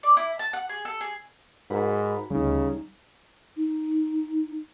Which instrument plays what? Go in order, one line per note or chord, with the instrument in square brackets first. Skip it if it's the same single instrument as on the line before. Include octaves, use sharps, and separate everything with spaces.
[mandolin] D5
E4
A5
F#5
G#4
A4
G#4
[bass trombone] G#2 [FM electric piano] F#4 A#4 B5
[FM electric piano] D2 [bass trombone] C#3 [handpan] G3 D#4
[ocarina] D#4